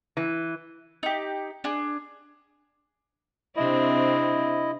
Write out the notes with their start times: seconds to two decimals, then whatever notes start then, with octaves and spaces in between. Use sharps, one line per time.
0.17 E3
1.03 D#4 G4
1.64 D4 G#4
3.56 C3 C4 D4 E4 D#5